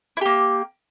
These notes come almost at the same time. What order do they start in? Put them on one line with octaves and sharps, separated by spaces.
E4 G4 A#3